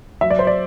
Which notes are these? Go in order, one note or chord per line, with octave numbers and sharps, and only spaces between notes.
F#3 E5
D5
C5
D5